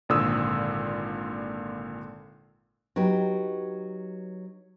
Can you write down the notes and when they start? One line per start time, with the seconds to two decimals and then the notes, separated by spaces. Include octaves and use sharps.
0.09 G#1 A#2 D3 D#6 E6
2.96 F#3 D#4 G4 B4